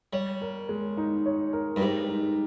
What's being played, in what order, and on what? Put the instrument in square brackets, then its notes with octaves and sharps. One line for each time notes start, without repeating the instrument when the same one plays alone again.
[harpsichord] G3 [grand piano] C#5
[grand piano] A#4
G#3
D#4
C#5
A#4
[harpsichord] G2
[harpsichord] G#2 [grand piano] G4
[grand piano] D#4